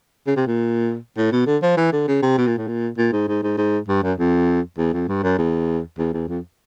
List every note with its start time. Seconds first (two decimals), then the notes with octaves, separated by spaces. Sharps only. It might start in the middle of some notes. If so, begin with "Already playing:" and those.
0.27 C#3
0.36 C3
0.47 A#2
1.17 A2
1.32 B2
1.47 D3
1.62 F3
1.77 E3
1.92 D3
2.08 C#3
2.23 C3
2.38 B2
2.47 A#2
2.58 A2
2.68 A#2
2.98 A#2
3.13 G#2
3.28 G#2
3.43 G#2
3.58 G#2
3.88 G2
4.03 F#2
4.18 F2
4.78 E2
4.93 F2
5.08 G2
5.23 F#2
5.38 E2
5.98 E2
6.13 E2
6.28 F2